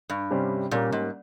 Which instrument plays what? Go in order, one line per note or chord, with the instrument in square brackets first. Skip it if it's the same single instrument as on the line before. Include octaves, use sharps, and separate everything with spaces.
[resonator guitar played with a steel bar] G2
[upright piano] C3 G3 C#4 G4 C5
[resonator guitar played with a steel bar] A#2 [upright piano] G3 A#3 C#4
[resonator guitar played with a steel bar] G#2